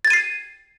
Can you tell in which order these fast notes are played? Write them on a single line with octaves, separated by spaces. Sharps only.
A6 G#6 D#7 C7